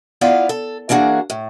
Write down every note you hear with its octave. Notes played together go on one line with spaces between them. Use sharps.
B3 E4 F4 D5 F5
A4
E3 A#3 D4 F#4 G#4
A2